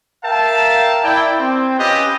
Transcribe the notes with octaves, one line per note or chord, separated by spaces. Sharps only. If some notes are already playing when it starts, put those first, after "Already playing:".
A#4 E5 F5 G5 A5
E4 D5 G5
C4
C#4 F4 G4 B4 D#5 G5